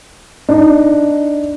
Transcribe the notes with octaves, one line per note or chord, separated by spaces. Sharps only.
D4 D#4